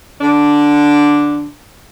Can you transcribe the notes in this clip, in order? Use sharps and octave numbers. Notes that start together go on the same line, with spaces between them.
D3 D4